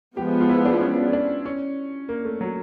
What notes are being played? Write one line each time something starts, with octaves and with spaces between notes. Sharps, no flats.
F3 G#3 B3 G4
F4
E4
D4
C#4
D4
C#4
A#3
A3
F#3